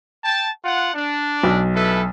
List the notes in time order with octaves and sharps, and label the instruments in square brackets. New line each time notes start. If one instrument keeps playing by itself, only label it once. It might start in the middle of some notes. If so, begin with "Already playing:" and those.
[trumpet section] G5 A5
F4 F#5
D4
[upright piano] B1
[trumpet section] E4 A4 B4